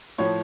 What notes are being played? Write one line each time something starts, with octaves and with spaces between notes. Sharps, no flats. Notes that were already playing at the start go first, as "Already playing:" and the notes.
A2 F3 C#5